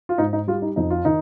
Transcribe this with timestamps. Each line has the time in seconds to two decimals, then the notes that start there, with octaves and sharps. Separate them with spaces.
0.09 F4
0.18 G#2 D#4
0.33 D#4
0.48 G3 F4
0.62 D#4
0.76 F2 D#4
0.90 F4
1.05 D#3 D#4